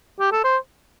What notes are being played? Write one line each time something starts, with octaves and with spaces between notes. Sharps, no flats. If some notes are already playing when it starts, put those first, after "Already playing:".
G4
A4
C5